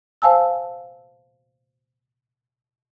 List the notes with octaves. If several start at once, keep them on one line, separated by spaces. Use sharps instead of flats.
C5 F5 G#5 A5 E6